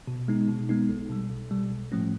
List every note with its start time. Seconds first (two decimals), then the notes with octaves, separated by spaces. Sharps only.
0.07 B2
0.28 G#3 B3 D#4
0.48 B2
0.69 G#3 B3 D#4
0.89 B1
1.10 B2 G3
1.30 B1
1.51 B2 G3
1.71 B1
1.92 A2 F3 A3 C#4